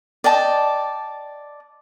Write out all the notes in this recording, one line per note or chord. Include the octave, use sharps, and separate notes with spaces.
D5 D#5 G5 A5